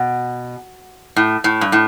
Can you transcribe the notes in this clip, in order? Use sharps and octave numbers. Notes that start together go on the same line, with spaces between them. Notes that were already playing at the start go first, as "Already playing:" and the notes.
Already playing: B2
A2
A2
G2
A2